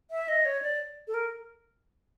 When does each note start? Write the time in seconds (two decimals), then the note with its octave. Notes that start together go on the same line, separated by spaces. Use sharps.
0.11 E5
0.28 D#5
0.45 C#5
0.62 D5
1.07 A4
1.14 A#4